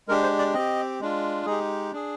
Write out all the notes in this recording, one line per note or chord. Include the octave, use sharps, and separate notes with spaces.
G#3 D4 G4 A#4
C5
D5
C4 G4 D#5
G#3 D4 F4
G#3 D#4 G4 G#4
D4 G#4